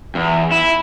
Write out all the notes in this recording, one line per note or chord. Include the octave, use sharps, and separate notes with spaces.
E2
E4